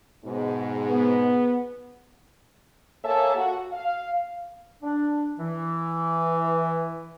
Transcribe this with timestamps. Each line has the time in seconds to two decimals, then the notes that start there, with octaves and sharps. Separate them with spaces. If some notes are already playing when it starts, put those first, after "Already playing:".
0.24 G#2 B2
0.90 B3
3.04 A#3 A4 C#5 E5 G#5 A5
3.35 F#4
3.72 F5
4.82 D4
5.39 E3